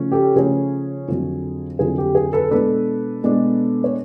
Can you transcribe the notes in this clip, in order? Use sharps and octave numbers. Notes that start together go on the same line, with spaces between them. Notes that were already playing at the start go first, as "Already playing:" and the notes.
Already playing: C#3 F3 A3 C#4
G4 A4
C#3 F3 A3 C#4 G#4
F2 D3 F#3
F2 D3 F#3 G#4
G4
G#4
A4 B4
B2 G#3 B3 D4 A4 B4
B2 G#3 B3 D4
C#5